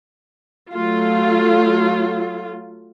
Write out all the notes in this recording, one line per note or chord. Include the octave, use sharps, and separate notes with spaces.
F#3 A3 F4